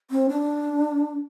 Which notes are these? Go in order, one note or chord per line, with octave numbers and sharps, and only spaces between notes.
C4
D4